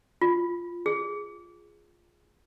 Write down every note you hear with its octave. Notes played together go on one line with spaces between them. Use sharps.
F4
G#4